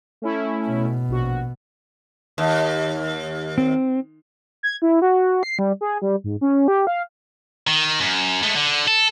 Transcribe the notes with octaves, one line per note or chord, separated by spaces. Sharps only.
A3 C#4 E4
B2
A#1 F#4
D#2
C4
G#6
E4
F#4
C7
G3
G#4
G3
G#2
C#4
G4
F5
D#3
F#2
G#3 A3
D3
A4